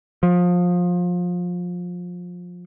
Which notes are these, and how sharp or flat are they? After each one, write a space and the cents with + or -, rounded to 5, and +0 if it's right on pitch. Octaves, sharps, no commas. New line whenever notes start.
F3 +25